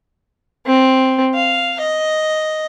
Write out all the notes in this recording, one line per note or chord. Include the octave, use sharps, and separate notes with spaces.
C4
F5
D#5